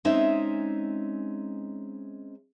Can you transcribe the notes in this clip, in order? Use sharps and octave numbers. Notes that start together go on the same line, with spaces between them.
G#3 C4 C#4 D#4 E5